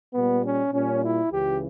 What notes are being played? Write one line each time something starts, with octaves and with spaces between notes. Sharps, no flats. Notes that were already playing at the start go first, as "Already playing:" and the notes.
A#2 G3 B3
C#4
A#2 G3 C#4
E4
C#2 C#3 E3 G4